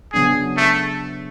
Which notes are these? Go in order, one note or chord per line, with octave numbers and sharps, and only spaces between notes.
C#3 F#3 B3 D4 G#4
A3